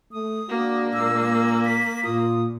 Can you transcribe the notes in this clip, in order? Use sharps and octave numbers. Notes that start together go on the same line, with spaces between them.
A3 D#6
G#3 A#3 D4 F#4
A#2 E6
B6
A#2 F4 D#6